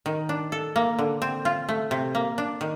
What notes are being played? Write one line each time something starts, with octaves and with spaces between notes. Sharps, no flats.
D#3
D4
A4
A#3
D3
C4
F4
A3
C3
A#3
D4
D#3